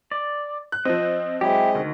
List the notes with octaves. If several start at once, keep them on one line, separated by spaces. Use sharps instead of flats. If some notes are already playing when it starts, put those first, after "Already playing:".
D5
F#6
F3 C4 D#5
F#3 G#3 C4 E4 G4 D#5
D2 D#3